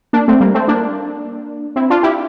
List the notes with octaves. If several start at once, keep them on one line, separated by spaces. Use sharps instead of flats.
A#3 D4
A3 C4
G3 A#3
A3 C4
A#3 D4
C4 E4
D4 F4
E4 G4